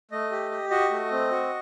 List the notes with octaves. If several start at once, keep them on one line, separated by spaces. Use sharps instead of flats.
A3 D#5
G4
G4
F#4 D#5
A3
C4
F#4